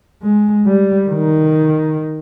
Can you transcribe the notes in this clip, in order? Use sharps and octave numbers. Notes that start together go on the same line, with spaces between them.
G#3
G3
D#3